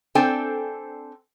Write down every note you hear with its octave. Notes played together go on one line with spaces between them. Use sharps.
C4 D4 A4 C5 G5 G#5